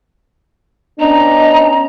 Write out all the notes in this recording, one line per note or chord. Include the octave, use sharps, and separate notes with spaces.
B3 C#4 D4 D#5 A#5